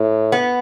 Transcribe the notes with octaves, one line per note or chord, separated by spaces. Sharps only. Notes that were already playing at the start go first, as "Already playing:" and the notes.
Already playing: A2
B3